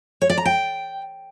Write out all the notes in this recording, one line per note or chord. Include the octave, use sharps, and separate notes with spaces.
C#5
D5
A#5
G5